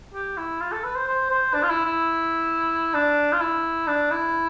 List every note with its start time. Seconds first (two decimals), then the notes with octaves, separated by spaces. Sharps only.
0.14 G4
0.37 E4
0.61 F4
0.72 A4
0.84 B4
0.96 C5
1.07 C5
1.30 C5
1.54 D4
1.63 F4
1.70 E4
1.85 E4
2.94 D4
3.32 F4
3.41 E4
3.87 D4
4.11 E4